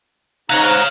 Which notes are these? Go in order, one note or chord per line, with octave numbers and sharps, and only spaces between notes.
G#2 C#5 F5 A#5 F#6